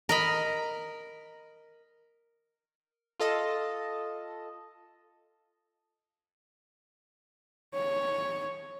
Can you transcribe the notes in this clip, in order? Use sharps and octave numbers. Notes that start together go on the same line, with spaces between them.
A#4 D#5 B5
F4 A4 D#5 A5
C#5